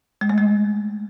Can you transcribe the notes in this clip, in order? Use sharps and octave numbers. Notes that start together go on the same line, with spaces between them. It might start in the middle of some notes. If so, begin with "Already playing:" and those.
G#3
A3
G#3